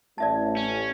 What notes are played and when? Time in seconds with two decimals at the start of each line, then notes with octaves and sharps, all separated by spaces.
0.18 A1 D5 E5 A5
0.57 C#4